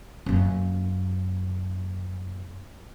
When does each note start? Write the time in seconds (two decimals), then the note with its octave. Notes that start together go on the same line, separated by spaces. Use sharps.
0.26 F#2 A#3